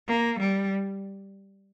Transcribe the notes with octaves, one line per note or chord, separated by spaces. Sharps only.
A#3
G3